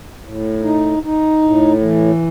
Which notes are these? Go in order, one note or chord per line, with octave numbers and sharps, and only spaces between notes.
A2
D#4
D#4
A2
E3